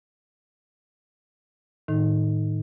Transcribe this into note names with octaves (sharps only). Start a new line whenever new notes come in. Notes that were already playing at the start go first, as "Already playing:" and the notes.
A2 D#3 D#4